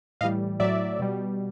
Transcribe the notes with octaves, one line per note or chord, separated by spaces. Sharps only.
A2 E3 G3 D#5 F5
A2 F#3 D5 E5
B2 G3